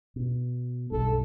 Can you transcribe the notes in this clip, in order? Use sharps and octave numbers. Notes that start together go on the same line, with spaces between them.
B2
B1 G2 A4